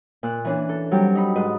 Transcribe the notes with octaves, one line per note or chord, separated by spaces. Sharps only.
A#2 F#6
E3 C#4 D4
A4
F#3 G3 C4 G4
D#4 B5
G#2 B4 D#5